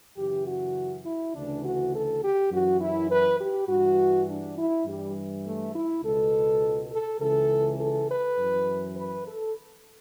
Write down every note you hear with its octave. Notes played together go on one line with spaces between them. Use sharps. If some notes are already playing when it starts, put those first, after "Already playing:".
F#2 C#3 E3 G4
F#4
E4
D2 C#3 E3 D4
F#4
A4
G4
F#2 E3 F#4
E4
B4
G4
G2 E3 F#4
D4
E4
G2 E3 G3
A3
E4
C#2 B2 A4
A4
C#2 C#3 E3 A4
A4
B4
F#2 E3
B4
A4